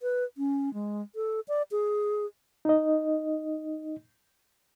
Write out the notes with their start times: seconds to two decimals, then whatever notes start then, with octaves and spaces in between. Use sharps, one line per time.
0.02 B4
0.37 C#4
0.74 G#3
1.15 A4
1.48 D5
1.71 G#4
2.65 D#4 D#5